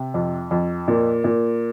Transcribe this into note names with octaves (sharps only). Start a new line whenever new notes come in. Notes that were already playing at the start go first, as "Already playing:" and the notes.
Already playing: C3
F2
F2
A#2
A#2